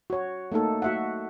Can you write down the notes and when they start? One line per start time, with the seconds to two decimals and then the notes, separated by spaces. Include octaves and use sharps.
0.10 F#4 C#5
0.52 A3 A#3 D#4 A4
0.82 F#4 E5 F#5